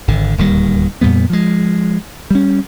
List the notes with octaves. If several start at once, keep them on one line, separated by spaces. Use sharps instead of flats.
G#1 D3
D1 D#2 D#3 G3
F2 A#2 G3 B3
F3 G#3
G3 C#4